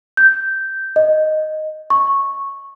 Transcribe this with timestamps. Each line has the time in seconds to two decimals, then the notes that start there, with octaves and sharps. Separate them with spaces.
0.17 G6
0.96 D#5
1.90 C#6